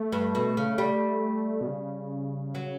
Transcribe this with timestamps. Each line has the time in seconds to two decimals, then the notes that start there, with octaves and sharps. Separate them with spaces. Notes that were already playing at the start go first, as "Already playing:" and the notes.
Already playing: A3
0.12 G2
0.35 B2
0.57 C#3
0.78 G3
1.61 B2
1.67 C#3
2.55 F#3